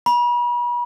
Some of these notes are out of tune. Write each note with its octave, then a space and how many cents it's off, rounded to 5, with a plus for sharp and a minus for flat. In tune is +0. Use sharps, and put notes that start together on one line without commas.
B5 -40